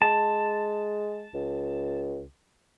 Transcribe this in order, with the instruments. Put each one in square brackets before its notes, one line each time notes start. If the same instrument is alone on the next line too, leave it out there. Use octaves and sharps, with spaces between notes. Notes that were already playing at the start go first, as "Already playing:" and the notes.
[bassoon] G#3 [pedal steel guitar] A5
[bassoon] C#2